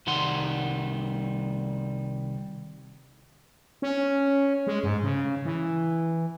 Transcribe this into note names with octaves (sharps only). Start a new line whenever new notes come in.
C2 D#3 G3 F#5 C6
C#4
G#3
G#2
C#3
E3